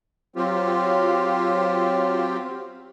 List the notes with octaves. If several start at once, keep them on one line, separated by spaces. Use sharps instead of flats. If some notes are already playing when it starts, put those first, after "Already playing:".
F#3 C4 F4 G4